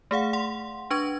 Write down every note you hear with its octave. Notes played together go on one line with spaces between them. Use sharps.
A3 G#4 F5 F#5
F#5 C6
D4 B4 C#6 G#6